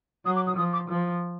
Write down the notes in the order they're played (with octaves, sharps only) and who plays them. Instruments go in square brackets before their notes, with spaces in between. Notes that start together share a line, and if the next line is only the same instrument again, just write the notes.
[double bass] F#3 [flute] D#6
[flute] D6
D#6
[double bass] F3 [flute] D#6
[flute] D6
[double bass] F3